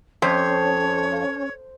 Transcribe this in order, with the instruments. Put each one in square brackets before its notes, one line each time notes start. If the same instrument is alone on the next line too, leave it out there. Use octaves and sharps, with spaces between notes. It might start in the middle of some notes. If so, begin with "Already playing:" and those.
[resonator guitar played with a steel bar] F2 [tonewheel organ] C#4 [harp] C5 [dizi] C#5